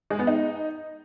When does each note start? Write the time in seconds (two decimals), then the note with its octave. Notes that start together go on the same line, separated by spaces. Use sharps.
0.10 G#3
0.19 B3
0.27 D#4